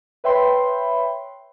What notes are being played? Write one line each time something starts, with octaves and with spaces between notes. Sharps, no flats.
B4 C#5 E5 G5 B5 C6